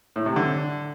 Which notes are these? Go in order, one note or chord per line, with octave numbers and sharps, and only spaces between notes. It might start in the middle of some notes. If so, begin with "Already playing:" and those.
A2
C3
D3